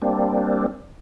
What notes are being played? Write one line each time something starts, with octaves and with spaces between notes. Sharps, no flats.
G3 A#3 C4 D4